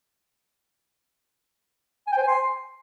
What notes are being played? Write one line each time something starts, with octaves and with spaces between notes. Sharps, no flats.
G#5
G5
C5
G#5
C6